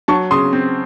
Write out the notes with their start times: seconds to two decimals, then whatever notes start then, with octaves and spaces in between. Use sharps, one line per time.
0.08 F#3 A5 C#6
0.31 C#3 C6 D#6
0.53 C4